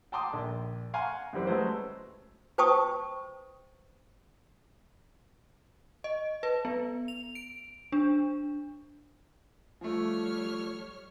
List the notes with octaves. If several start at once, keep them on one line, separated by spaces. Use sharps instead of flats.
G5 A5 A#5 C6 D6 D#6
A#1
F5 F#5 G#5 A#5 C6 C#6
F#2 E3 G3 C4
F#3 G#3 A3 B4 C5
B4 C5 G5 A5 C#6 D#6
D#5
B4
B3
F7
D7
D4
F3 G3 A3 C#5 F6